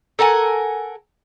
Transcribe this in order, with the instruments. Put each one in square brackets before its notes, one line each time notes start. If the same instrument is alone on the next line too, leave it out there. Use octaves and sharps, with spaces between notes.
[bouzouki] A4 A#4 F#5 G#5